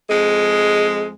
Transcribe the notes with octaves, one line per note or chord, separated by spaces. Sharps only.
F2 G#3